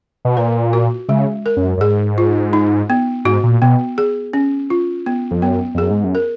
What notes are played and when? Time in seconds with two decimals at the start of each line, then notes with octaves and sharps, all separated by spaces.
0.25 B2
0.37 A#2 B4
0.73 F#4
1.08 C#3 G#3
1.46 A#4
1.57 F#2
1.77 F#2
1.81 G#2 G#4
2.18 F4
2.53 D#4
2.90 B3
3.25 G#2 F#4
3.43 A#2
3.62 B2 B3
3.98 G#4
4.33 C#4
4.70 F4
5.06 B3
5.31 F2
5.42 F#2 B3
5.74 F2
5.78 F#2 G#4
5.91 G#2
6.04 F#2
6.15 A#4